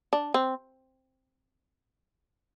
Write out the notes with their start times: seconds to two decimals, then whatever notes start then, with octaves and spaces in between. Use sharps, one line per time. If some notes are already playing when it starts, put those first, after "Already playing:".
0.13 D4
0.34 C4